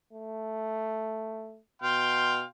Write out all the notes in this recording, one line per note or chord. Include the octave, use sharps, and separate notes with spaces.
A3
B2 F5 G5 C6